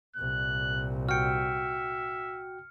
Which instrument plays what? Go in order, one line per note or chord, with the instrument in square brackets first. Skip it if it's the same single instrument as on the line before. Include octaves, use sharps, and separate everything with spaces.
[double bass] C2 A#2 [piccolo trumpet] F#6
[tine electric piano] F#4 G5 [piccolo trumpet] E5 [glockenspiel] F6 C#7